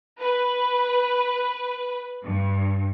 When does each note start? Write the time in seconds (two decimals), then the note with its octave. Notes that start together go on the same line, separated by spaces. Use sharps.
0.20 B4
2.23 G2